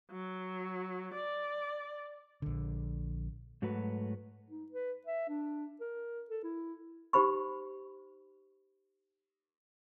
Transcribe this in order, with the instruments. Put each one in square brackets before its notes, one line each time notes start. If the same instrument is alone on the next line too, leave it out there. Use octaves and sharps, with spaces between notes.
[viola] F#3
D5
[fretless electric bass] A#1 D3
[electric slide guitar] G#2 F#3 A3 F#4 B4
[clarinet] D#4
B4
E5
D4
A#4
A4
E4
[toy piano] D#4 G4 C5 B5 C#6